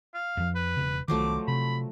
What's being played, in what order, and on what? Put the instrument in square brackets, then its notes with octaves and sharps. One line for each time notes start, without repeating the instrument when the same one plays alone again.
[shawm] F5
[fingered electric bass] F2 F3
[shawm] B4
[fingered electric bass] E1 C#3
[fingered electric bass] C2 D#3 [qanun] F3 F#3 A3 [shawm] D6
[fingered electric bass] C3 [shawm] B5